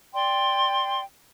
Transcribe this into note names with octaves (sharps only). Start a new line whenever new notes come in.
D5 G5 C6